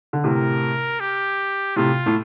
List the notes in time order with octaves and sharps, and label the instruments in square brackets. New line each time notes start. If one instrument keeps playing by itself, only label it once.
[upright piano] D3
[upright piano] A2 C3 [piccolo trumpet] A#4
[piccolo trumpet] G4
[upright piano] A2 C3 [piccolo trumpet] F4
[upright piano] A2